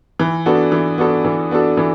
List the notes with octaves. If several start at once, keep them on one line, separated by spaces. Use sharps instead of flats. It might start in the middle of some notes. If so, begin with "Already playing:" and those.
E3
B3 D4 F#4 A4
E3
B3 D4 F#4 A4
E3
B3 D4 F#4 A4
E3